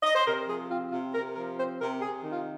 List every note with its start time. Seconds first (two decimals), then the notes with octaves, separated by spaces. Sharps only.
0.02 D#5
0.15 C5
0.25 C3 A#4
0.47 F3 G#4
0.69 C4 F4
0.92 C3 F4
1.14 C3 A#4
1.35 F3 A#4
1.57 C4 C5
1.79 C3 A#4
2.01 C3 G#4
2.23 D#3
2.31 F4